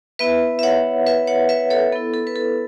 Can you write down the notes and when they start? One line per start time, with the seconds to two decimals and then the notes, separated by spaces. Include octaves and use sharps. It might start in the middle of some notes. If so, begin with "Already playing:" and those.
0.19 B3 E4 B4 E5
0.59 E5
0.63 C#5 F#5
1.07 B4 E5
1.27 C#5 F#5
1.49 B4 E5
1.70 A4 C#5
1.93 B3 E4 A4
2.14 A4
2.27 B4
2.36 A4